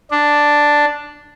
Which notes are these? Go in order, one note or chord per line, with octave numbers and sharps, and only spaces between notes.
D4